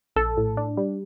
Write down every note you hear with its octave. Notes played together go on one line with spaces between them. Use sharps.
A#1 A4
A2
D4
G3